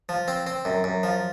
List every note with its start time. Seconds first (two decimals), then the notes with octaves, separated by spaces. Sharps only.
0.09 F3
0.28 C4
0.47 C4
0.65 F#2
0.84 F#2
1.03 F3